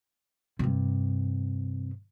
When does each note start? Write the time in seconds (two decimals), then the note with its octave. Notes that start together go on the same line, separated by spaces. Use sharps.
0.59 G2 C3